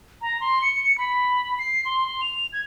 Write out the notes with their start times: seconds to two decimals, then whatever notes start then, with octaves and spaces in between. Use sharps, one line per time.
0.22 A#5
0.41 C6
0.62 C#7
0.98 B5
1.58 C7
1.85 C6
2.07 C6
2.21 F7
2.53 G#6